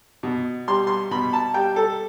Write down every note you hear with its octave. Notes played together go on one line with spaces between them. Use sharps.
B2
G3 C6
C6
B2 B5
A5
G3 G5
A4